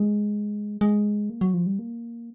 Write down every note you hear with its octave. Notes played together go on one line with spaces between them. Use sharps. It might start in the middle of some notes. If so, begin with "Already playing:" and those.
Already playing: G#3
G#3
A#3
F#3
F3
G3
A#3